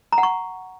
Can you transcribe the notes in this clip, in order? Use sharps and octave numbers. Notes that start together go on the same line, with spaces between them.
A#5
F#5
C#6